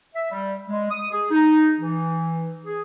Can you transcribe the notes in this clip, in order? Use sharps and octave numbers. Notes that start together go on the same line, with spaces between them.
E5
G3
G#3
D#6
G#4
D#4
E3
G#4